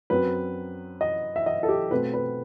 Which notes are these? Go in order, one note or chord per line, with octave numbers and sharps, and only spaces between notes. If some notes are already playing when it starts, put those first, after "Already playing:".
F#2 F#3 C4 B4
D#5
E5
D#5
A4
G4
B2 A3 C4 B4
B4